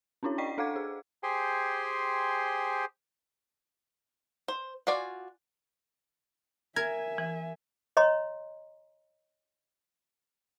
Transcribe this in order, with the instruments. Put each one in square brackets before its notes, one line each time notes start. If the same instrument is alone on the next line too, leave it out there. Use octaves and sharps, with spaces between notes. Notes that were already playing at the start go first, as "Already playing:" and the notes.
[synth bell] C#4 D4 E4 F#4 C#5
D5 D#5 G5 C#6 B6 C7
D4 A4 F5 F#5 D6 G#6
G#4
[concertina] G4 G#4 C5 G5 G#5 C6
[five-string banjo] C5
F4 F#4 D5 G#5
[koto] A#4 [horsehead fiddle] E5 G#5 [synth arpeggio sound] G#6
[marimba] E3
[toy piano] C#5 D#5 A#5 C6